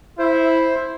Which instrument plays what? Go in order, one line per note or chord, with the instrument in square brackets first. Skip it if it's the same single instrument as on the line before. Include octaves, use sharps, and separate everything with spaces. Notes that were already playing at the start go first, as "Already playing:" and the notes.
[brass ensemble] E4 [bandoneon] C5